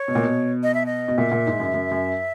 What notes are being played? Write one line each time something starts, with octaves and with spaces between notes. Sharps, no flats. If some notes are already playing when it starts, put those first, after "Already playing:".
Already playing: C#5
B2
A#2
B2
D#5
E5
D#5
B2
A#2 E5
A#2
G#2
F#2
F#2
F#2